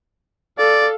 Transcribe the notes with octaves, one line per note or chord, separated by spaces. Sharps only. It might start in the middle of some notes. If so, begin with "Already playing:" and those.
A4 D5 F5